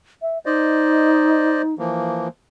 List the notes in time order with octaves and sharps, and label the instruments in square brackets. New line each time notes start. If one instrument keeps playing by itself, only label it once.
[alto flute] E5
[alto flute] D#4 [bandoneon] C5 D5 D#5
[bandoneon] E3 F3 A#3